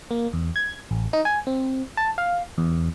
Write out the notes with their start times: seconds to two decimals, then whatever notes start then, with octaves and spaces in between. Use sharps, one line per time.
0.11 A#3
0.33 E2
0.56 G#6
0.91 A1
1.13 D#4
1.25 G#5
1.47 C4
1.97 A5
2.18 F5
2.58 E2